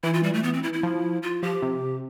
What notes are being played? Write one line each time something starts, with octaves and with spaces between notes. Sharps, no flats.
E3 E4
F4
G3
A3
B3
C4
E4
E4
F3
F4
F3 G4
C3